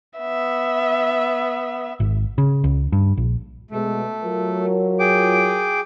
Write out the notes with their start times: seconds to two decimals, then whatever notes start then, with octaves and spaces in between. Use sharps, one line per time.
0.19 B3 E5
2.00 G#1
2.38 C#3
2.64 C#2
2.92 G2
3.17 A#1
3.71 B2 G#3 A3
4.24 F#3 F4 A#4
4.99 G#4 G5 D6